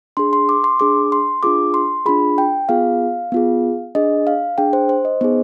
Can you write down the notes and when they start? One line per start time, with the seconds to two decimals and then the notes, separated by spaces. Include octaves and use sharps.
0.17 D4 G#4 C6
0.33 C6
0.49 D6
0.64 C6
0.80 D4 G#4 D6
1.12 C6
1.43 D4 F4 G#4 D6
1.74 C6
2.06 D4 F4 G#4 B5
2.38 G5
2.69 B3 F4 G#4 F5
3.32 B3 F4 G#4
3.95 D4 G#4 D#5
4.27 F5
4.58 D4 G#4 G5
4.73 C5
4.89 C5
5.05 D#5
5.21 B3 D#4 G#4 C5